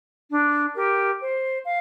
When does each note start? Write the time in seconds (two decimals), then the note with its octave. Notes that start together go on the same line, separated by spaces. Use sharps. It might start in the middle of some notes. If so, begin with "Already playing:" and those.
0.30 D4
0.75 G4 A#4
1.21 C5
1.65 F5